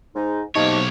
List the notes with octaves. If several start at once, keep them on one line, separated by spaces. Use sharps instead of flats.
G#2 D#4
B1 C3 A#3 D#4 C#5 D#5 A5